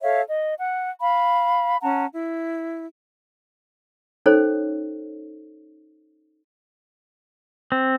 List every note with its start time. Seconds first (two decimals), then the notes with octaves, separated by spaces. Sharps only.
0.02 A4 C#5 E5 F5
0.29 D#5
0.59 F#5
1.01 F5 B5
1.82 C#4 F#5 A5 A#5
2.11 E4
4.26 C#4 D#4 A4 C5 C#5
7.72 C4